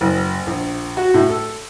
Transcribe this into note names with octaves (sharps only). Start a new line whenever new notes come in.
F#1
A#1
F#4
A2
A4